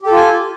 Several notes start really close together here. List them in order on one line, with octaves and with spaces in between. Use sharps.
G4 A4 F4 G#5